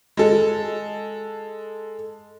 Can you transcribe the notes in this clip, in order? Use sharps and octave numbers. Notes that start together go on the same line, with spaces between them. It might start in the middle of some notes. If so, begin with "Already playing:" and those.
G#3 A4